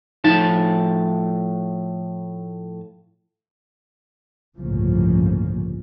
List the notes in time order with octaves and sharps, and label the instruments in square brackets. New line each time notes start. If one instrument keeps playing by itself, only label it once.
[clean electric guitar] A2 F3 A5 [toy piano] D#4
[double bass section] G1 C2 A2 C#3 F3 A#3